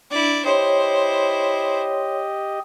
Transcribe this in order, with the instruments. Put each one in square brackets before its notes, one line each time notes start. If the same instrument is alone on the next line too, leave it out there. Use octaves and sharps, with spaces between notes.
[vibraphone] D4 [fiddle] E4 D5
[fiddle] E4 C5 [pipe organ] G4 D#5 [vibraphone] C#5 C6